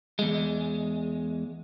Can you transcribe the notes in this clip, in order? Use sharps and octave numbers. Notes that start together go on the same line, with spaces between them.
E2 G#3